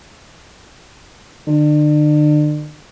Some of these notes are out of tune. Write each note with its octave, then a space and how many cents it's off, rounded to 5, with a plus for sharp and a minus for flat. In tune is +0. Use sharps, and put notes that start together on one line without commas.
D3 +40